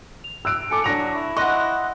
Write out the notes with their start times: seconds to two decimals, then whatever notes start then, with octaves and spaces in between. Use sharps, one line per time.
0.24 F7
0.45 E6 F#6 D7
0.71 A4 G#5 D6 C#7
0.84 F#3 D4 A#6 F7
1.15 E4
1.37 D#5 F#5 C6 C#6 F#6 A#6